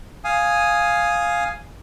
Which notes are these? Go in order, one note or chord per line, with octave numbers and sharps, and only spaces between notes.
F5 G#5 D#6